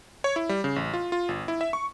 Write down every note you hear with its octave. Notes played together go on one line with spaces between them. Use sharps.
C#5
E4
G3
C#3
A1
F4
F4
G1
E4
E5
C#6